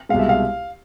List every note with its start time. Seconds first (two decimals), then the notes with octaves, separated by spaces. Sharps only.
0.09 C2 B2 G#3 F5
0.19 E5
0.29 F5